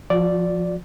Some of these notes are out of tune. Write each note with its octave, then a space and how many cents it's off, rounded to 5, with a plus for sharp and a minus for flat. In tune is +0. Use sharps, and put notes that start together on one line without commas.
F3 +0 F#4 -45 D5 -5